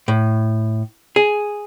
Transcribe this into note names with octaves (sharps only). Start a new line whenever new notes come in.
A2
G#4